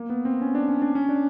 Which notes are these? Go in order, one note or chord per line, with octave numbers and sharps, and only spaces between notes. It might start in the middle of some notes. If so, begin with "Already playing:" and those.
Already playing: A#3
B3
C4
C#4
D4
C#4
D4
C#4
D4